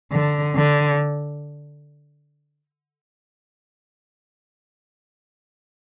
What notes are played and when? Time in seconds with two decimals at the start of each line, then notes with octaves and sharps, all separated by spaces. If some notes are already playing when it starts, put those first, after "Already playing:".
0.12 D3
0.56 D3